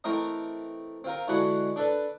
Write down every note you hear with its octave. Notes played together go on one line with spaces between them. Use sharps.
E3 A3 C4 A#4 D#5
C4 F4 A#4
D3 E3 G#3 F#4 F#5 B5
D4 A4 B4